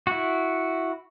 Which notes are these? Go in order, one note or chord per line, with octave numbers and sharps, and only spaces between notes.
E4 F#4